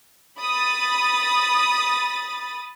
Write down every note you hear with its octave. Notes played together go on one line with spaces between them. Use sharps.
B5 D#6 A6